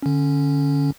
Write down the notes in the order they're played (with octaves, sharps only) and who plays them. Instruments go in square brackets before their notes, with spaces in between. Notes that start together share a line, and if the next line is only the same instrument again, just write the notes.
[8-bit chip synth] D3 C#4